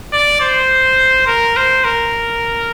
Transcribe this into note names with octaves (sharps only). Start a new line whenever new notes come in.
D5
C5
A#4
C5
A#4